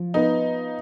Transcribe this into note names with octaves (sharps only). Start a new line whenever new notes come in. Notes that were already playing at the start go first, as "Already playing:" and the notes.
Already playing: F3
B3 D#4